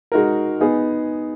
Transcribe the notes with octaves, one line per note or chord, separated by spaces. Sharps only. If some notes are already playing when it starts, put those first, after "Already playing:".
G#3 D#4 F#4 A#4
B3 D#4 G#4